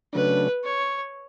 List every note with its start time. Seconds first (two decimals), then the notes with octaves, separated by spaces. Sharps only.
0.13 C#3 F#3 A3 D4 B4
0.64 C#5